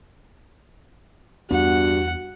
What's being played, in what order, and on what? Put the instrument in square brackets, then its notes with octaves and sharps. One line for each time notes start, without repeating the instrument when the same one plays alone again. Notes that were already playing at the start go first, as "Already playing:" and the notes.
[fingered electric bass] E2 B3 [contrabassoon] G2 [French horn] F#4 [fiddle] F#5